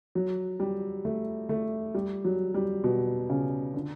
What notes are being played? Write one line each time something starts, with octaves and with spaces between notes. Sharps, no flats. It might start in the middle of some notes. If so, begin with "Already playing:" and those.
F#3
G3
A3
A3
G3
F#3
G3
B2
C#3
D3